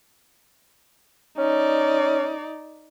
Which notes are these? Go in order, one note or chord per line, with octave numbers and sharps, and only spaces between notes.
C#4 D#4 D5